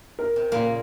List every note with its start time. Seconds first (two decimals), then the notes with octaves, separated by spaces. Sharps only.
0.19 A#4
0.36 C3
0.52 A#2 C#3 A#3